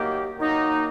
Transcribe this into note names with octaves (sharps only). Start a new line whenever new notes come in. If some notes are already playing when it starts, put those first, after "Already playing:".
Already playing: D#3 F#3 A#3 D#4 G4
D#3 F#3 A#3 D#4